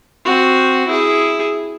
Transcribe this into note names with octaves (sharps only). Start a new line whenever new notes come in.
C4 F#4
E4 G#4